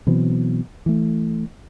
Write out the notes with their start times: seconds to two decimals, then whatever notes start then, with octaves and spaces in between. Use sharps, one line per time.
0.07 B2 E3 F#3 C4
0.86 E3 A3